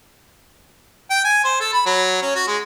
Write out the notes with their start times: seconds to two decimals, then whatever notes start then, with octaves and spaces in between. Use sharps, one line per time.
1.10 G5
1.24 G#5
1.45 C5
1.60 A4
1.73 B5
1.86 F#3
2.22 C#4
2.35 F#4
2.47 G#3